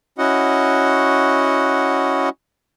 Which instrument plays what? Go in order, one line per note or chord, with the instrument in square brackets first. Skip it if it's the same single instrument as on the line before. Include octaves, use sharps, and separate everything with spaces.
[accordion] C#4 E4 F#4 D#5 F#5